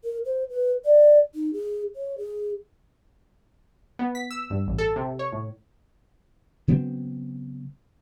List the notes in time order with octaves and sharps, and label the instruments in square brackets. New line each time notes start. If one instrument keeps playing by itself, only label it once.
[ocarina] A#4
C5
B4
D5
D#4
G#4
C#5
G#4
[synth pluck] B3
B6
E6
G2
A1
A4
C3
C#5
A2
[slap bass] C#3 F#3 B3 C4